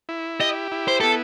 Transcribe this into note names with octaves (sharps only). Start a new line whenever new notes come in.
E4
G4 D#5
E4
C5
B3 A4